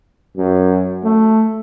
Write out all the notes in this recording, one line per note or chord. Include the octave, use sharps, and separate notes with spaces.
F#2
A3